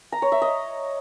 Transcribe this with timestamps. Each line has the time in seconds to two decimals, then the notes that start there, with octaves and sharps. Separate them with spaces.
0.12 A#5
0.22 C#5
0.32 E5
0.42 D#5